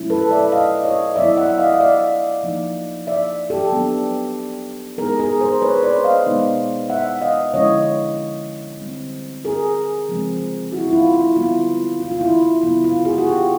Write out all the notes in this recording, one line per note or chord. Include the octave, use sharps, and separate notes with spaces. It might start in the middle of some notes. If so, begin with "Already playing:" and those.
Already playing: B2 F#3 A3 C#4 E4
A4 B4
D5 E5
D#5 F5
C#5 D#5
F#3 B3 E4 D5 E5
E5 F#5
D#5 F5
F5
D5 E5
F3 A#3 D#4
D5 E5
G4 A4
F#3 B3 D4
B2 G#3 B3 D#4 G#4 A#4
G#4 A#4
A#4 C5
B4 C#5
C5 D5
D#5 F5
B2 G#3 B3 D#4
E5 F#5
D#5 F5
D3 F3 G#3 C#4 E4 C#5 D#5
D3 G3 C4
G#4 A#4
C#3 F3 G#3 C4
E4 F#4
E4
F4
E4
D3 G3 B3 E4 F4
F4
F4
E4
E4
C#3 F#3 B3 E4
F4
F#4 G#4
F#4
F4 G4